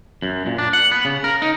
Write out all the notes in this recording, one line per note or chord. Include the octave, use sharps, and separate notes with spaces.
F#2
A#2
D4
F#5
B3
C#3
A#4
D#4